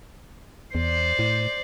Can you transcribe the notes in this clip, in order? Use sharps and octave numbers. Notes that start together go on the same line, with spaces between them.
E2 C5 D5
A2